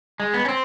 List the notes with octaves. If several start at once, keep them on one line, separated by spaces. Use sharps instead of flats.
G#3
B3
C#4
C4